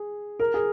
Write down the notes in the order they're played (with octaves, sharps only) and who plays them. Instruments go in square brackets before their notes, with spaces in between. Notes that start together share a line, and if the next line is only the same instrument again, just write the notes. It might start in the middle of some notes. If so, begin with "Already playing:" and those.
Already playing: [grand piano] G#4
A#4
G#4